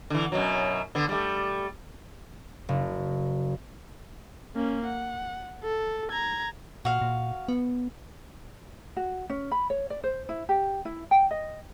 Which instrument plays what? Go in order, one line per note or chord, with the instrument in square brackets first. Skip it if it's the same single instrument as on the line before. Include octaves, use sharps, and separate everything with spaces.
[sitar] D3 E3
F#2 B2 F#3
D3 B3
G3 A3
[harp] F#1
[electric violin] A#3 C#4
F#5
A4
A#5 G#6
[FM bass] A#2 [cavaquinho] F#4 F5
[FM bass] A#2
B3
[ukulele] F#4
C#4
B5
C#5
D5
C5
E4
G4
E4
G5
D#5